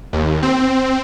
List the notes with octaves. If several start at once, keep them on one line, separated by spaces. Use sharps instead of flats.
D#2
C4